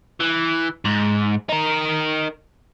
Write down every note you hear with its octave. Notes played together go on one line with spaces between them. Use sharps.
E3
G#2
D#4 A#4